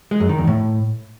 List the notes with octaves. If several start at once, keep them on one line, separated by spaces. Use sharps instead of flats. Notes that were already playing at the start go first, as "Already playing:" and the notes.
G#3
F#2
D#3
E2
A2